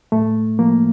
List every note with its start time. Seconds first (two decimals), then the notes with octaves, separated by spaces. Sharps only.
0.12 A2 A3
0.59 F3 A#3